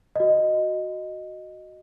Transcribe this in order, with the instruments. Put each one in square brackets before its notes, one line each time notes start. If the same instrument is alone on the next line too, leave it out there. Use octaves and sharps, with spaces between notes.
[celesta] F#4 D#5